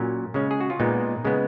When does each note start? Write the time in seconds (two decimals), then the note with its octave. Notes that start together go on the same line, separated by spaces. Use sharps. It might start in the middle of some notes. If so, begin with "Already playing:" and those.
Already playing: A#2 F#3 C#4
0.34 C#3 G#3 C#4
0.51 G#4
0.61 F#4
0.70 F4
0.80 A#2 G#3 B3 D#4
1.25 C#3 G#3 B3